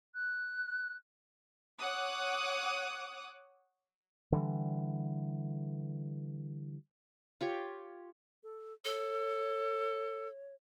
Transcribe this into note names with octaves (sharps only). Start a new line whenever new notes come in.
F#6
C#5 F#5 D6 D#6 F#6
D3 E3 G3
F4 G4 C#5
A4
A4 C#5